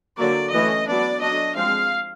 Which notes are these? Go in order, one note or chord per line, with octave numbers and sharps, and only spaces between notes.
D3 F#3 A#3 D5
E3 A3 C#4 D#5
F#3 B3 D4 D5
F#3 A3 D4 D#5
F3 G#3 C4 F5